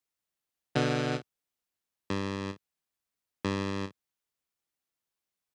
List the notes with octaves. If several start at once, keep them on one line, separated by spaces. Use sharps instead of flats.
B2 D3
G2
G2